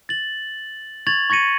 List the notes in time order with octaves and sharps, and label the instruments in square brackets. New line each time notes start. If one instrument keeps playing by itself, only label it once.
[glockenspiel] A6 F#7
C#6 G#6 A6 F7 F#7
C#6 G#6 A#6 C#7 D#7